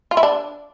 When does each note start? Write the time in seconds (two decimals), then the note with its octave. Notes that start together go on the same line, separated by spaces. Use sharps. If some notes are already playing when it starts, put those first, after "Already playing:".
0.11 F4
0.17 E4
0.23 D4